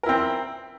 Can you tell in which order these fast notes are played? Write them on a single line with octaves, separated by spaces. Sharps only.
A#4 E4 C4